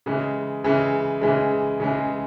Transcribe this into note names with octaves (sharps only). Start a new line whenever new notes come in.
C#3 E3 G#3
C#3 E3 G#3
C#3 E3 G#3
C#3 E3 G#3